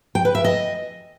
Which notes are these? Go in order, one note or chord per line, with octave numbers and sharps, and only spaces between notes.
G5
B4
E5
D#5